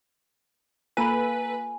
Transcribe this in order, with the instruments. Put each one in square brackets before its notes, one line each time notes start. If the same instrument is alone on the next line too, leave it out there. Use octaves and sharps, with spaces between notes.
[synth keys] A#3 A4 D#7 [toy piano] F4 A#5 B5 [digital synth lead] B4 [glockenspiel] G#5